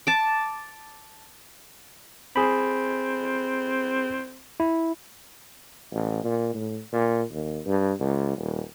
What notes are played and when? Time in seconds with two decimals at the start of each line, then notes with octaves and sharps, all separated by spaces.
0.07 A5 D6
2.36 C4 G#4 B5
4.60 E4
5.93 A1
6.24 A#2
6.54 A2
6.93 A#2
7.31 D#2
7.66 G2
8.00 C#2
8.38 D#1